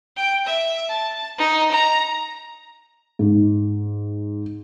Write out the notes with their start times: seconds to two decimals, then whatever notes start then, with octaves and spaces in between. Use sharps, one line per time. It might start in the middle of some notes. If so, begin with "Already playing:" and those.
0.16 G5
0.46 E5
0.89 A5
1.38 D#4
1.72 A#5
3.19 G#2